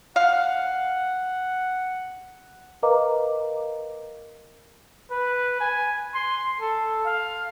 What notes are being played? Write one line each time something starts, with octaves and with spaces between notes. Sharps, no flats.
F5 F#5
A#4 B4 D#5 F5 A#5 D6
B4
G#5
C6
A4
F5